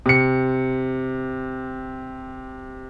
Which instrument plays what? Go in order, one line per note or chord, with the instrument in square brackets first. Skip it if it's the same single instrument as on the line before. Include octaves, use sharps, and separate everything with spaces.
[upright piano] C3 C#7